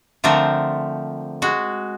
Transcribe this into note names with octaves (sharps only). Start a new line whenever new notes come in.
D3 F3 A3 C4 A#4
G#3 F#4